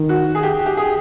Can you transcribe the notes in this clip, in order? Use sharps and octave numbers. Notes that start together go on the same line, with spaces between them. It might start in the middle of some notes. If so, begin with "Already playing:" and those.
Already playing: D#3
F#4
G#4
G4
G4
G#4